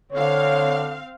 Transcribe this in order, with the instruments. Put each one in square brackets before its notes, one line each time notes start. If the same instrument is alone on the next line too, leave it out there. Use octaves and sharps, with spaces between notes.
[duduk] D3 [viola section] C4 F5 [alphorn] C#5